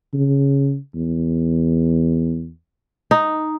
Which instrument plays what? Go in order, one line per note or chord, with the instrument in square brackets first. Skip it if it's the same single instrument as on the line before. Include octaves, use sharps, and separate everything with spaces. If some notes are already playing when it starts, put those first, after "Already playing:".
[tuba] C#3
E2
[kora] D#4